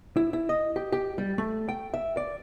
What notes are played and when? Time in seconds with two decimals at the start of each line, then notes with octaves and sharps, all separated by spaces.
0.17 E4
0.33 E4
0.49 D#5
0.76 G4
0.92 G4
1.18 G3
1.38 A3
1.69 G5
1.94 E5
2.17 D5